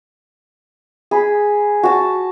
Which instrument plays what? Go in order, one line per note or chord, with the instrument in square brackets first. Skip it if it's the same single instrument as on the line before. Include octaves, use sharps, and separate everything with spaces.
[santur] G#4 B5
F#4 A5